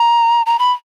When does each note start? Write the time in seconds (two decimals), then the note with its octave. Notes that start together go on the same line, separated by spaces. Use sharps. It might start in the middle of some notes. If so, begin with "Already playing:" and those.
Already playing: A#5
0.46 A#5
0.59 B5